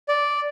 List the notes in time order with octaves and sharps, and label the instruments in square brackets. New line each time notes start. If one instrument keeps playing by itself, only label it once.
[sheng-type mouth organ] D5